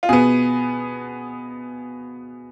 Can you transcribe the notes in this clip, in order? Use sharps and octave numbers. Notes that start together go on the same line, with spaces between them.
F4
B2 B3 G#4